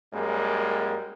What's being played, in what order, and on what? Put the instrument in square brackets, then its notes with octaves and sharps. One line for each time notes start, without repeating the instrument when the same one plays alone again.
[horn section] F#2 G3 G#3 A#3